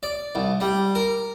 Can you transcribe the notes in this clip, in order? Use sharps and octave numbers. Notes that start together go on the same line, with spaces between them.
D5
C2
G3
A#4